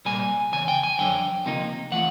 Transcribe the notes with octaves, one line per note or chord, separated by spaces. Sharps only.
C2 A#2 G3 A#3 G#5
E2 C#3 G#5
G5
G#5
F2 D3 F#3 G5
D2 C3 F3 A#3 D#4
E3 A3 F4 F#5